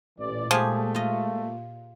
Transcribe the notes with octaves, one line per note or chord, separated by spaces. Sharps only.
A1 A#2 E3 D5
F3 G#3 A3 G4 G#4
F4 D#5